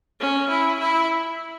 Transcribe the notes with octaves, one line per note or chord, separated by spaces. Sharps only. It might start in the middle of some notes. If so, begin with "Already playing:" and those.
C#4
E4
E4